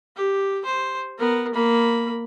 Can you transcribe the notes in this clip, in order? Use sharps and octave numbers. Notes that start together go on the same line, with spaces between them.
G4
C5
B3 A#4
A#3 B5